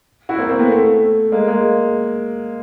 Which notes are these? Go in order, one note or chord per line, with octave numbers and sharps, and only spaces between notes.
E4 F#4
A#3 C4
A#3 C4
A3 B3
A3
G#3 A#3
G#3 A#3